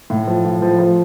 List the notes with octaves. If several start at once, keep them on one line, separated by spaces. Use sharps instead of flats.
A2
F3
A2
F3
F3